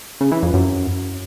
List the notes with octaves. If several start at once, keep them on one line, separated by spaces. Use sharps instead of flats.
C#3
E3
F2
F#2